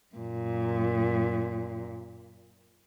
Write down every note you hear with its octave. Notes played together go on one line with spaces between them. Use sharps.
F#2 A#2